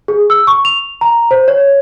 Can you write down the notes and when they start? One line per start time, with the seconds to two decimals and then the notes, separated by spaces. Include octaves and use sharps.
0.08 G#4
0.30 E6
0.47 C#6
0.65 F7
1.01 A#5
1.31 C5
1.48 C#5